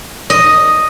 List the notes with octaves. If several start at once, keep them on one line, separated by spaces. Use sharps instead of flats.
D#5